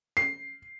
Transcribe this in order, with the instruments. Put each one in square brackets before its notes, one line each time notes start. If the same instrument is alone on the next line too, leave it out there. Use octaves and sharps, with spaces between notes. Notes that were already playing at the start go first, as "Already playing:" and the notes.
[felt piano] C7